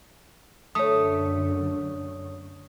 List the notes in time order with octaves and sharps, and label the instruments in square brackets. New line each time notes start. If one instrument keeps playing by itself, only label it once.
[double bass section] F#2 D3 [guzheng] A3 [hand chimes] C#5 D#6